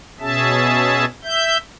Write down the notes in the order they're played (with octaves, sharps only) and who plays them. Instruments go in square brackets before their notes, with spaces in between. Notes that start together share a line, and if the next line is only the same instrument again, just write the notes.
[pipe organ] B2 C#4 G#4 E5 A5
E5 G6